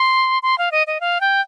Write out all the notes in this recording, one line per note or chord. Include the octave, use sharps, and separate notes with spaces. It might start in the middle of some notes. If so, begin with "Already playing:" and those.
Already playing: C6
C6
F5
D#5
D#5
F5
G5